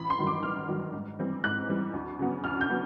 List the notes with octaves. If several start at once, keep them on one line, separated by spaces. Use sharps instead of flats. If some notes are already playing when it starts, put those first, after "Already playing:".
Already playing: A1 B5
C6
G2 D#3 F#3
D6
A1 F6
G2 D#3 F#3
G#2
E3 G3 C4
G#2 F#6
E3 G3 C4
D2
C#3 F#3 B3
D2 F6
G6
F#3 B3